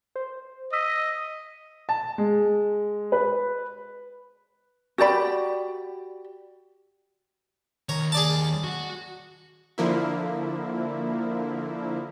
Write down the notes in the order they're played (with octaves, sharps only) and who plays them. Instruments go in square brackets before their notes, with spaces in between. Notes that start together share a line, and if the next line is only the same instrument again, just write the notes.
[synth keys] C5
[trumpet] D#5 [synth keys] D#6 E6 B6
[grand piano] A5
G#3
B4
[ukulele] F#4 G4 D5 B5
[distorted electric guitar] D#2 [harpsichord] C#5 A#5
[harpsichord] G#4 D5 A5
[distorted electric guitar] F#4
[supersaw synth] D3 F3 A#3 E4